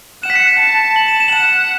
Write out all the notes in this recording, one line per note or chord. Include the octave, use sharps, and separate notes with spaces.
F#5 E7
B6
C#7
E7
A5
F#7
E7
E7
F#7
F#5 E7